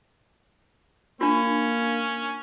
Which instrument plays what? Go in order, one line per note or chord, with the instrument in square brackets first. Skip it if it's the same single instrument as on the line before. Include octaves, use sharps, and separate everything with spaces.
[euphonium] A#3 [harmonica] C#4 [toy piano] D4 F4